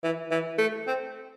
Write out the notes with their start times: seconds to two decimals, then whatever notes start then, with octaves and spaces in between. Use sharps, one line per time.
0.03 E3
0.31 E3
0.58 A3
0.87 C4